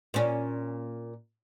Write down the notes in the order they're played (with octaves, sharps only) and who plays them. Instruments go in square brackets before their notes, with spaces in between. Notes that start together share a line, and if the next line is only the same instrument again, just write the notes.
[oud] A#2 C#4